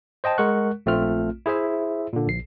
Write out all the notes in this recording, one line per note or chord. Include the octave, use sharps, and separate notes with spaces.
C5 D#5 G5 A5
G#3 A#4 F#5 C#6 F#6
A#1 A3 C4 F4 F6
E4 G#4 C5 E5
A#2 D3
A#1 C7